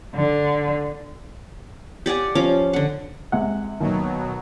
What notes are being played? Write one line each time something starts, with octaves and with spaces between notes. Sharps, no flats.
D3
G4 D5 F#5 G#5
F3 C#4 F5 D6
D3 F#5
C3 G#3 F#5
D#2 B2 F#3